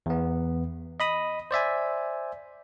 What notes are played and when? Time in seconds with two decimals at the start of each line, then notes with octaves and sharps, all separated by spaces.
0.06 E2 B3
1.00 D#5 B5 D#6
1.51 C5 D5 E5 G#5